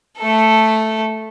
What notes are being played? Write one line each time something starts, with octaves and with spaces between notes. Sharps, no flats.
A3 A4